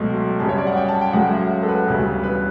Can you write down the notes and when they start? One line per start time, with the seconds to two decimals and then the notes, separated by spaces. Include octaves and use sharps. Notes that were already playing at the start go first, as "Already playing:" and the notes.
Already playing: C#2 B2 F#3 A3
0.40 F#2 C#3 G3 A5
0.49 C#5
0.58 D5
0.67 F#5
0.77 G5
0.89 A5
1.01 G5
1.13 C#2 C#3 F#3 A3 F#5
1.32 E5
1.63 A4
1.68 B4
1.87 E1 D2 C#3 G3
2.24 B4